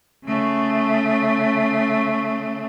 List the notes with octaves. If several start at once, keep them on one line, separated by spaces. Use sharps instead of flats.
C#3 A3